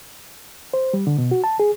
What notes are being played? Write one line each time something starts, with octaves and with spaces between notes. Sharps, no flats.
C5
G3
D3
B2
F#4
A5
G#4